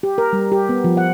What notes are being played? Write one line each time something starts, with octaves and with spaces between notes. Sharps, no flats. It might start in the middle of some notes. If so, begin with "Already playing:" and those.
G4
A#4
G3
G4
B3
F3
F#5